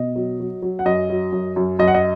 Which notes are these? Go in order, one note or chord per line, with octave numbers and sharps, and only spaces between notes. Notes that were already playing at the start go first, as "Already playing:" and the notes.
Already playing: B2 D#5
F#3
F#3
F#3
F#5
F#2 D#5
F#3
F#2
F#2
F#2 D#5
F#5
D#5